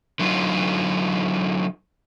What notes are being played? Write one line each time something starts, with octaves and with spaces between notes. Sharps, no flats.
D3 F#3 D#4 F4